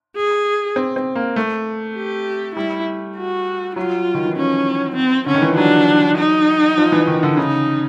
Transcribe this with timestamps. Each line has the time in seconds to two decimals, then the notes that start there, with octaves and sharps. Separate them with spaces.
0.16 G#4
0.76 C4
0.96 C4
1.15 A#3
1.36 A3
1.96 G4
2.56 G3 E4
3.17 F#4
3.76 F#3 F4
4.14 D#3
4.25 E3
4.36 F3 C#4
4.96 C4
5.26 D3 C#4
5.34 D#3
5.42 E3
5.50 F3
5.57 F#3 D4
6.18 D#4
6.78 F3
6.92 E3
7.07 D#3
7.23 D3
7.37 C#3 D#4